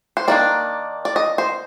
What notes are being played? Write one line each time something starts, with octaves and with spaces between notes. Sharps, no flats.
C5
D#3 A#3 D4 D5
D5
D#5
C5